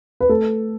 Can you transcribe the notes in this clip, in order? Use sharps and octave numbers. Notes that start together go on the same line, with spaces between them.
B4
A3 A4